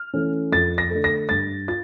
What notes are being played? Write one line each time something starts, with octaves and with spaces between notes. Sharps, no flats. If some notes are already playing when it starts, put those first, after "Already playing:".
Already playing: F6
E3 A3 C#4
F2 A6
A#6
D3 A3
A#6
G2 A6
F4 A6